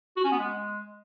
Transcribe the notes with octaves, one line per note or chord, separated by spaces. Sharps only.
F#4
C#4
B3
G#3